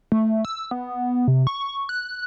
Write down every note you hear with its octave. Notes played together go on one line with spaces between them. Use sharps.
A3
E6
B3
C3
C#6
F#6